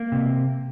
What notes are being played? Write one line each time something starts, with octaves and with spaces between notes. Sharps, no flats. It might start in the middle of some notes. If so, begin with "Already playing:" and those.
Already playing: A#3
C3